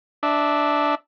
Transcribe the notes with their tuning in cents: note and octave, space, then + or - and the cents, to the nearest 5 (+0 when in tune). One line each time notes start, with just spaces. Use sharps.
D4 +0 E5 -15